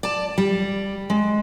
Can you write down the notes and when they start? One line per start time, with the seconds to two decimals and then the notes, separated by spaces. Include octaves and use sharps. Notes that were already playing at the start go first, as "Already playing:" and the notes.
0.03 D5 A5
0.38 G3
1.10 G#3